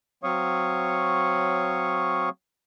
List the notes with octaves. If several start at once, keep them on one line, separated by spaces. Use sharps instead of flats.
F#3 C4 C#5 F5 C#6 D#6